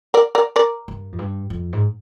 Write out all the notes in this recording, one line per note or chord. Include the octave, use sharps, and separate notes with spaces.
A#4 D5
A#4 D5
A#4 D5
G2
F2
G2
F2
G#2